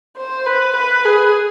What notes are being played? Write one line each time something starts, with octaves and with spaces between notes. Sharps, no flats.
C5
B4
B4
G#4